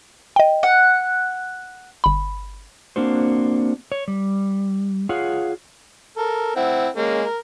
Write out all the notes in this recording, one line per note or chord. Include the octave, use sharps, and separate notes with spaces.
D#5 G5
F#5
G1 B5
A#3 C4 D4 F#4 C5
C#5
G3
F4 G#4 C#5 F5 F#5
A4 A#4
C4 E4 F#5
G#3 A#3 C#4
A#4